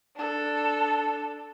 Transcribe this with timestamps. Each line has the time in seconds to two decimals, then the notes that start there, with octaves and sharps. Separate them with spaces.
0.16 D4 A4